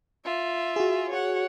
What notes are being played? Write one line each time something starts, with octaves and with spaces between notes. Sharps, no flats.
F4 E5
F#4 G#4
C#5 F#5